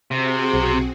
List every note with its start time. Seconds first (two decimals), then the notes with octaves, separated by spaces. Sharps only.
0.11 C3 C4 F#4 G#4
0.54 B1